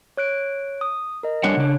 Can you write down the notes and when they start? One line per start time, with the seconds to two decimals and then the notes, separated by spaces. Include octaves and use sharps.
0.17 C#5 F#6 D7
0.81 D#6
1.23 A#4 D#5
1.43 G3 D4 C#5 F#5 F#6
1.57 C#3 D4